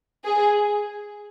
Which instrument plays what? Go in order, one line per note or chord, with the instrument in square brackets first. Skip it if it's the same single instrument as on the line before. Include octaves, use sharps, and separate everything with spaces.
[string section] G#4